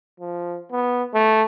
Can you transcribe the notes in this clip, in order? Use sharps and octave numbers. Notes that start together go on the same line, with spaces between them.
F3
B3
A3